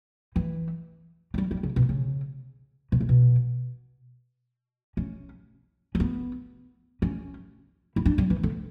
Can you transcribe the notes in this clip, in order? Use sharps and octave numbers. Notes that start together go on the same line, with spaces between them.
E3
F#3
G3
G3
C#3
B2
C#3
B2
C#3
B2
C#4
C#4
B3
C#4
E4
D4
G3
E3
D3